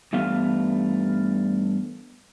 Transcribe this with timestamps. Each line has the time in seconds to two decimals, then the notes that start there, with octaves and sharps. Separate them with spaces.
0.13 G2 E3 A3 B3 F5